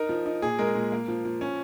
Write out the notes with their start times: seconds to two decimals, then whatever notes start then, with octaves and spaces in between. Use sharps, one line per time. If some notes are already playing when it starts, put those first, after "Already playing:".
Already playing: D#4 A#4
0.09 F3
0.26 D#4
0.42 A#2 G#4
0.59 G#3 A#4
0.75 A#2
0.92 A#3
1.08 F3
1.25 F3
1.41 C#4